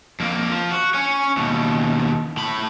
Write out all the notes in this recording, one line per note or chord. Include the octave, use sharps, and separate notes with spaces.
F2 A#3
F3
F#4
C#5 G#5
D#2 B2
A2 B5